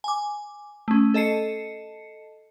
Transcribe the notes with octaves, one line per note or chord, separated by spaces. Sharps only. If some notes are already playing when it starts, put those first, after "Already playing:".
G#5 D6
A3 C#4
A4 D#5 A5 C7 C#7